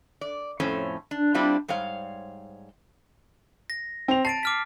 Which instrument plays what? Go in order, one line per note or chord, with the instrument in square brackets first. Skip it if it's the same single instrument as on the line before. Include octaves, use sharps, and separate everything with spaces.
[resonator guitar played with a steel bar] D5
F2 A2 C#4 C5
D4
G3 C4 D4 E4 F4
G#2 G3 C5 C#5 F5
[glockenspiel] A#6
[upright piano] C4 F7
[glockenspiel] A5 A6 D7 [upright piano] C7
[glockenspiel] D6 F6 B6